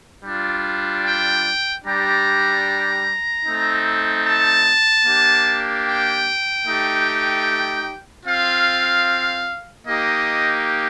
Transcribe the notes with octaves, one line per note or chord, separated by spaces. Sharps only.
G3 D4 F4
G5
G3 D4 G4 A#5
A3 C4 D#4
A5
A#3 D4 G4
G5
A3 D#4 G4
C4 F4 F5
A#3 D#4 G4 D#5